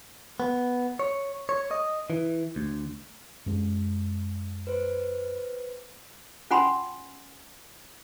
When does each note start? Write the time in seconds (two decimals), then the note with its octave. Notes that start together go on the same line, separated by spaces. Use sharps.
0.40 B3
0.99 C#5
1.49 C#5
1.71 D#5
2.10 E3
2.56 D2
3.46 F#2 G#3
4.67 B4 C5
6.51 C#4 F4 F#5 G#5 B5 C6